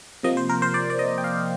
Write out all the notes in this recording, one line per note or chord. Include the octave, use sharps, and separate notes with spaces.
C3 F3 A#3 D#5
C5
A#4
C5
D5
D5
D#5
G5
F5